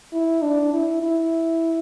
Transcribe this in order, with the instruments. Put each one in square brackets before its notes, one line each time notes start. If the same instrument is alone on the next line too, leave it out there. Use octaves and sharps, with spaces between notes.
[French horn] E4
D4
E4
E4